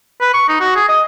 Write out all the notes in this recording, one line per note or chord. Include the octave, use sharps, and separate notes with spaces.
B4
C#6
D#4
F#4
G#4
D#5